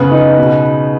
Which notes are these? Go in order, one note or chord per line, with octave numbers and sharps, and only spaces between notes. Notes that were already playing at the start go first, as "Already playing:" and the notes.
Already playing: C#3 B3 B4
D#4
B2